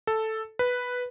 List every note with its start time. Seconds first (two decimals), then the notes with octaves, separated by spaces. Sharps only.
0.07 A4
0.59 B4